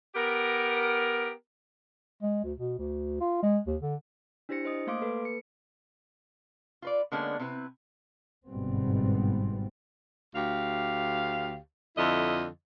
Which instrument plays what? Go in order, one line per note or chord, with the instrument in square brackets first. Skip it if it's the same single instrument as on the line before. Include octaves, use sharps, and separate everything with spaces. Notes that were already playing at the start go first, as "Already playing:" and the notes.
[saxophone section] B3 G4 A#4
[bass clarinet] G#3
D2
B2
D2
F4
G#3
D#2
D3
[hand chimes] D4 E4 G4 C5 A#6 C#7
C5 D#5 D#6
A3 A#3 F5 C6 D6 D7
A#3 A4 B4
C#7
[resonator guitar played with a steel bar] F4 B4 D5
D3 G#3 A#3 B3 C#4 D4
C3 C4 E4 B4
[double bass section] G1 G#2 B2 G3 B3 C4
[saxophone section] D2 G4 F5
F2 D3 E4 D#5